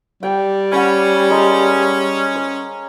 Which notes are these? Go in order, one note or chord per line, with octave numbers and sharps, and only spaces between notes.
G3 G5
C#4 F#5 B5
G#3 A#4
C#5